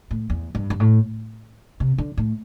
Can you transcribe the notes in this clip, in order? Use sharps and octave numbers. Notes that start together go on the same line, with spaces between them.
A2
E2
G2
G2
A2
C3
D3
A2